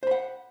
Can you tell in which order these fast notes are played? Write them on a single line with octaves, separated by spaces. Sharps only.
C5 B5 F#5